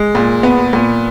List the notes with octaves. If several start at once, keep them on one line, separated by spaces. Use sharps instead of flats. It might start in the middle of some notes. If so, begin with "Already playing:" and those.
Already playing: G#3
A#2
B3
A#2